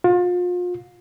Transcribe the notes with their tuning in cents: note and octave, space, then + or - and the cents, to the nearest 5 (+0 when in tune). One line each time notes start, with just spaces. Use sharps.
F4 +35